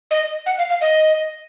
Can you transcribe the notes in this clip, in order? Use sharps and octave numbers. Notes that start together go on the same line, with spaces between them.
D#5
F#5
F5
F5
D#5